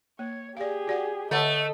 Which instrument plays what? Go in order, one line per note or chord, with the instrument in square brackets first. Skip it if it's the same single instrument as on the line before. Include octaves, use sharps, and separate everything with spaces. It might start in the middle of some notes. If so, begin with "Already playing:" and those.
[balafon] A#3 [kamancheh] C#5
[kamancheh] G4 G#4 [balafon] D5 F5
[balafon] F#4 D5 F#5
[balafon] D3 C#5 F#5 [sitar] A3 [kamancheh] D#5